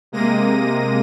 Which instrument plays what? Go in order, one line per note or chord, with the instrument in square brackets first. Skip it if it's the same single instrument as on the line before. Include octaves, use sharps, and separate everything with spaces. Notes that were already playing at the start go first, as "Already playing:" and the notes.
[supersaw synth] C3 G#3 A#3 A#6 D#7